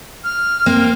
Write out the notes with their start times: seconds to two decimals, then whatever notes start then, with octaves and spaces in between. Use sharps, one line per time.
0.24 F6
0.66 A#3 C4